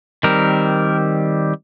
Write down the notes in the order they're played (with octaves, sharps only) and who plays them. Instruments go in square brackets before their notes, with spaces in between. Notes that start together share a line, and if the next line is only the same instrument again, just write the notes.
[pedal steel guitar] D#3 G3 C4 A#4